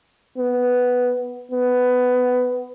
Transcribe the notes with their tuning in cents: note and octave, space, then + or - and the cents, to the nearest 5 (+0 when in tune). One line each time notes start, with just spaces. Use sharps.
B3 +0
B3 +15